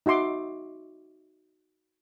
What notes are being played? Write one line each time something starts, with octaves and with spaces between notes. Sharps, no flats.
D#4 F#4 E5 C6 D6